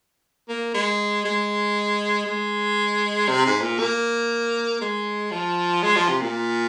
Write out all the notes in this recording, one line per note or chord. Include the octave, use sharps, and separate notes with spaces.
A#3
G#3
G#3
G#3
C3
G#2
A#2
A#3
G#3
F3
G#3
F3
C3
A#2